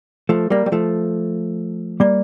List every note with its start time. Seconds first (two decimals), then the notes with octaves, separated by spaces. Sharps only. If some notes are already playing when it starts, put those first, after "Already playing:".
0.29 F3 A3
0.50 G3 A#3
0.66 G3
0.72 F3 A3
2.00 G3 A#3